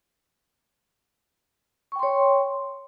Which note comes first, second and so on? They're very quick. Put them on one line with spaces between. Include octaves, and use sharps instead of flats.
C#6 G5 C6 C#5